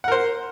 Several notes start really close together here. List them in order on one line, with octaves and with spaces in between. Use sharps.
F#5 A#4 C5